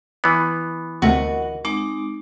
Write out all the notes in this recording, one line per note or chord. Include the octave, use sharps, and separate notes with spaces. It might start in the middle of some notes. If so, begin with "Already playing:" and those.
E3 B3
D2 C3 A3 F#4 A#4 D#5 F#5
G#3 C4 D#4 D6